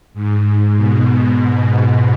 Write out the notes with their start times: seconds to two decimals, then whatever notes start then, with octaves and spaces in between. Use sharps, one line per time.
0.14 G#2
0.44 G#2
0.76 B2